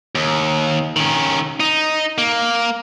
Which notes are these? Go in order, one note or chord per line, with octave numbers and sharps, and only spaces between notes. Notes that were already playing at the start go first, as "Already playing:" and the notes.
D#2
D#3 C#4
D#4
A#3